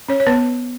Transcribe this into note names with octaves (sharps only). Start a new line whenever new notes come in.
C#4 C#5
C#5
B3 B4